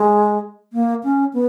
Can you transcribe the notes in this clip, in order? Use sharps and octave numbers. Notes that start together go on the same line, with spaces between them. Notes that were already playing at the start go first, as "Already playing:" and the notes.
Already playing: G#3
A#3
C#4
B3